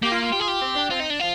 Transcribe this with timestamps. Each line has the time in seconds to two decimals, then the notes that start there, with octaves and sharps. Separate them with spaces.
0.02 A#3 G4
0.12 F4
0.22 F4
0.32 G4
0.40 G#4
0.48 G4
0.61 C4
0.76 D4
0.90 C4 F4
1.00 D#4
1.10 D4
1.19 F3 F4